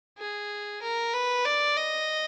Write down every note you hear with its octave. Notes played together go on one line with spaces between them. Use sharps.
G#4
A#4
B4
D5
D#5